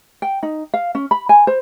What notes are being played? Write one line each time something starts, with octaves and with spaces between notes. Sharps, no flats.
G5
D#4
F5
C#4
B5
G#5
C5